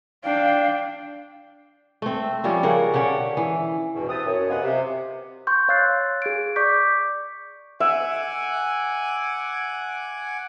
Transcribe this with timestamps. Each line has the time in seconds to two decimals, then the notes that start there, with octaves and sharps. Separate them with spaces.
0.24 D4 F5 G5
2.02 A3 C4
2.44 F3 G3 C#4 F4
2.63 C#3 A#4 C#5 F#5
2.94 D3 C#4 G4 F#5
3.37 E3
3.95 E2 G2 B2
4.09 E3 C4 G4 B4 A5 D#6
4.26 F#2 C#5
4.50 C3 B3 F4 D#5 F#5 G#5
4.63 C3
5.47 C6 C#6 G6
5.68 C#5 F5 E6 F#6 A6 C7
6.22 G#4 G#6 D7
6.56 D5 C#6 D6 G6 B6
7.80 E5 F#5 G#5 D6